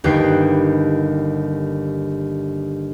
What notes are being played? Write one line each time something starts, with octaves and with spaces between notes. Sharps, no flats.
G1 D#2 B4 G5 C7